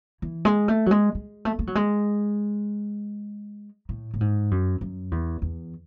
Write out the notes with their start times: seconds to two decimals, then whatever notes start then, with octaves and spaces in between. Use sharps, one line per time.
0.22 E3
0.45 G#3
0.68 A3
0.86 F#3
0.91 G#3
1.15 G#3
1.45 A3
1.59 A3
1.67 F#3
1.75 G#3
3.89 A2
4.14 A2
4.21 G#2
4.51 F#2
4.81 F#2
5.11 E2
5.42 E2